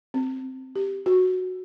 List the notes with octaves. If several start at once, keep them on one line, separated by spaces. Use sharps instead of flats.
C4
G4
F#4